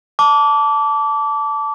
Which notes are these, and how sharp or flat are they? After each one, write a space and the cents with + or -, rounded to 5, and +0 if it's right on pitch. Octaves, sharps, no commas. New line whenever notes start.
A5 +0 D6 -25